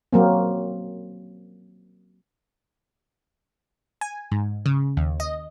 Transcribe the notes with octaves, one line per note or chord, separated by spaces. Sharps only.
F#3 A#3 C4
G#5
G#2
C#3
D#2
D#5